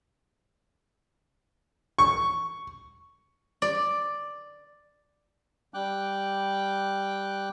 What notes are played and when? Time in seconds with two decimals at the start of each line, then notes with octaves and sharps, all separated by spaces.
1.99 C#6
3.62 D5
5.74 G3 G5 D6 F#6